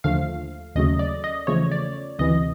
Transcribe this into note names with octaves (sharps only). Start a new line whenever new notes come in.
D#2 D3 F3 A3 F5
D#2 C#3 F#3 A3 D#5
D5
D#5
E2 C#3 F3 A3 C#5
D5
D2 C3 E3 D#5